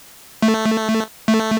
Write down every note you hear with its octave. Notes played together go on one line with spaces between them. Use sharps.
A3
A3